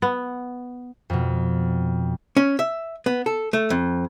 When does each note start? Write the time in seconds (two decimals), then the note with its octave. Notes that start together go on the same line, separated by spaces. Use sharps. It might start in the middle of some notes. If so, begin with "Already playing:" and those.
0.02 B3
1.10 F2 B2
2.37 C#4
2.59 E5
3.06 B3
3.26 A4
3.53 A3
3.70 F2